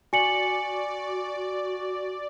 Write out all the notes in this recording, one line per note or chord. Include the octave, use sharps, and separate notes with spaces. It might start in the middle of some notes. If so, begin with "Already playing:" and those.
F#4 D5 G#5 C#7 F#7